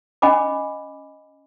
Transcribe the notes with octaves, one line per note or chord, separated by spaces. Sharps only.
C#4 D#5 F#5 G#5 B5 D6